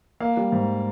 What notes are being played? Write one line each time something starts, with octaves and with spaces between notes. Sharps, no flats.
A#3 F5
G3
G#2